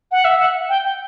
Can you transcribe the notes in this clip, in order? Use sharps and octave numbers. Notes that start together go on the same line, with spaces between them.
F#5
E5
F#5
G5